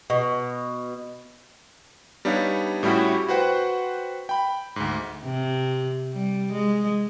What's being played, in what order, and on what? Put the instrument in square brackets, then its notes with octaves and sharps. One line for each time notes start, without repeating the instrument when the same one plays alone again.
[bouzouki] B2
[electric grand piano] G3 B3 D4 D#4 C#5 F5
A2 G3 C#4 E4 F#4 G4
F#4 B4 C5 F#5 G5
G5 B5
D2 G#2
[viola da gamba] C3
G3
G#3